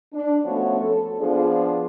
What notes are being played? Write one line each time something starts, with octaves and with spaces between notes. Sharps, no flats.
D4
F3 A3 B3 C#4 F#4 C#5
A4
F3 B3 D4 F4 G#4